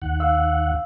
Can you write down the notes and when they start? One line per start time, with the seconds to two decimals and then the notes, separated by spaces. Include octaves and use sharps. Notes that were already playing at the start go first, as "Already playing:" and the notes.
0.02 D#2 F#5
0.20 F5 E6